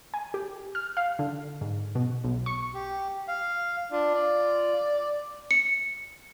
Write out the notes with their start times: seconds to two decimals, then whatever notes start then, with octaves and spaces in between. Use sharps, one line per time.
0.14 G#5
0.34 G4
0.75 F6
0.97 F5
1.19 D3
1.61 G#2
1.95 B2
2.24 B1
2.46 C#6
2.74 G4
3.28 F5
3.92 D4 F4
4.15 D5
5.51 C#7